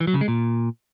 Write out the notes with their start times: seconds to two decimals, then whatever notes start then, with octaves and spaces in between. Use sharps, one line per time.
0.01 E3
0.07 F#3
0.14 C#3
0.21 G#3
0.28 A#2